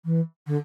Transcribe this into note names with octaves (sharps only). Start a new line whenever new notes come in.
E3
D3